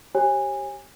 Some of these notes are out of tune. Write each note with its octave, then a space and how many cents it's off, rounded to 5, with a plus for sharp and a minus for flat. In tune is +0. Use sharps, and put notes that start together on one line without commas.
G4 -10 C#5 -35 G#5 -20